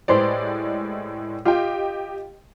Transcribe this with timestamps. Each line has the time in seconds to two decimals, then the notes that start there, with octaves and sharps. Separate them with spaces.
0.08 A2 G#3 G4 B4 C5 D5
1.45 F4 G4 D#5 G5